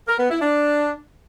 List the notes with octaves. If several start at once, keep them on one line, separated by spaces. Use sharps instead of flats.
A#4
B3
E4
D4